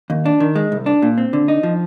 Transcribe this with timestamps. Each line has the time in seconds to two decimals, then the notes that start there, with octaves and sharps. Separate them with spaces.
0.10 D#2
0.26 D4
0.40 D#3
0.55 G#3
0.72 C2
0.86 D4
1.02 A#2
1.18 C4
1.33 D3
1.48 D#4
1.63 F3